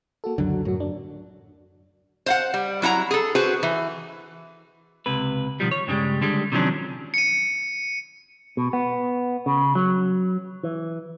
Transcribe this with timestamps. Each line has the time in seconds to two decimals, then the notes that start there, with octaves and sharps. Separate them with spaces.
0.24 A#3 F#4 A4
0.38 C#2 F#2 D3 F#3
0.65 F#2 A2 F#3 F#4
0.80 D4
2.26 C5 F5 F#5
2.54 G3
2.82 F#3 E4 F#5 A#5
3.11 G#4 A4
3.35 F#4 G#4 B4 C5
3.63 E3
5.06 C#2 C3 B4
5.60 B2 D#3 F3 G3
5.71 C#5
5.88 G2 C#3 E3 G3 G#3
6.22 D3 G3 G#3
6.52 C3 D#3 F3 F#3 C#4 D4
7.14 C#7 D#7
8.57 B2
8.73 B3
9.46 C#3
9.75 F#3
10.63 E3